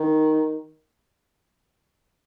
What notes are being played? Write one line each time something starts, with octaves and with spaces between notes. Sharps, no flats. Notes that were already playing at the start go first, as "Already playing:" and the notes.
Already playing: D#3